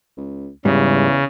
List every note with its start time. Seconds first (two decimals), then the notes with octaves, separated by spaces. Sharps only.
0.17 C#2
0.65 E2 G#2 C#3 G3